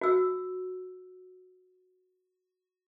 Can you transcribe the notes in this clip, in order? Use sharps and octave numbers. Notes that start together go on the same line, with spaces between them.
F#4 E6